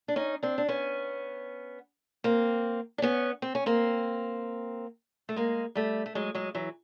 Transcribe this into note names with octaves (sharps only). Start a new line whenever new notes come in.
D4
C#4 D#4
C4 D4
D4
B3 C#4
A#3 C4
D4
B3 C#4
C4
C#4
A#3 C4
A3
G#3 A#3
G3 A3
A3
F#3 G#3
F#3 G#3
E3 F#3